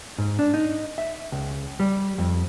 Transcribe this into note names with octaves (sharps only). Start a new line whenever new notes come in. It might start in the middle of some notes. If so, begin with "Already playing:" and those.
G#2
D4
D#4
E5
C#2
G3
F2